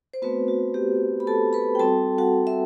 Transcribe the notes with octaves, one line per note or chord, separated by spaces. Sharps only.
C5
A3 B3 C4 F#4 B4
F#4
G4
B5
A4 A5
B4 B5
G5
G3 C4 F#4 A4 A5
F#4 F#5
E5